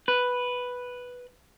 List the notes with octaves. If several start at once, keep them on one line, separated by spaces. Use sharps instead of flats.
B4